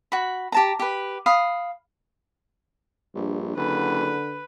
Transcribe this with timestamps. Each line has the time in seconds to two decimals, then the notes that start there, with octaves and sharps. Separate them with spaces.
0.12 F#4 B5
0.52 G4 A5 A#5
0.79 G4 B4
1.26 F5 B5 D#6
3.15 A#1 G2
3.57 F#1 D3 B4